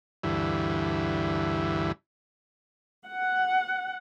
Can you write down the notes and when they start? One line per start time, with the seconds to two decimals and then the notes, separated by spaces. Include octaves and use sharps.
0.23 D2 G2 E3
3.07 F#5